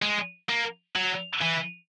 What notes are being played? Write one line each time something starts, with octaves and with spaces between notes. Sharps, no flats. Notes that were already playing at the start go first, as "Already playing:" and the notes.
G#3
A#3
F#3
E3